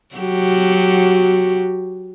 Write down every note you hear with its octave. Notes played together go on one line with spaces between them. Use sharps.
F#3 F#4 G4